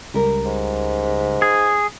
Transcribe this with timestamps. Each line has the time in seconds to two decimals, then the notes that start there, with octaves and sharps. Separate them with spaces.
0.14 C#2 G3 A#4
0.45 G#2
1.42 G#4